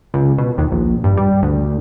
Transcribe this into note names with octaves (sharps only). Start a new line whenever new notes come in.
C#2
B2
D#2
A#1
G2
G3
D2